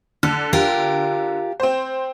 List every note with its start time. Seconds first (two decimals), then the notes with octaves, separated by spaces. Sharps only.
0.23 D3 A4
0.53 F4 G4 A#4
1.60 C4 C5